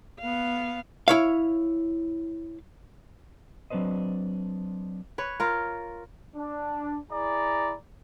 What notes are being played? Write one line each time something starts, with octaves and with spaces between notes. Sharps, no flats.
B3 F5
E4 C#5 F5
F#3 C4 D4 B4 C5 D#5
B4 C#5
F4 A#4
D4
E4 G#4 D5 A#5